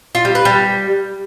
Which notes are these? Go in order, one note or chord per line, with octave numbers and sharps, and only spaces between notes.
F4
G3
B4
G3